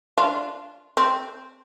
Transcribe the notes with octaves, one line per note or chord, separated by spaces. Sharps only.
D4 F4
C4